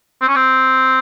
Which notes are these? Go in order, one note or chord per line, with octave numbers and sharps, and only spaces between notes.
C4
C#4
C4